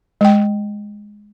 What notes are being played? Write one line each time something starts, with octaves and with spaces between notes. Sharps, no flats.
G#3 G5